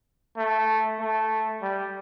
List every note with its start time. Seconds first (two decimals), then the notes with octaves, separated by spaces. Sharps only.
0.37 A3
1.00 A3
1.62 G3